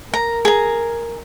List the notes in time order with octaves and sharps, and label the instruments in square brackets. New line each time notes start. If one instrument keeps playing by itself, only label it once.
[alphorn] A#4 [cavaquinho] A#5
[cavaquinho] G#4 A#5